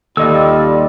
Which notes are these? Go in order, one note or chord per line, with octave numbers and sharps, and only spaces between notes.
D#2 G3 F4 A4 D5 D#5 E6